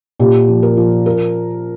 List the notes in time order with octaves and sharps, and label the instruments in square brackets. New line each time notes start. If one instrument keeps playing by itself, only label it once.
[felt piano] A#2 G4
F3
A#4
F3
A#4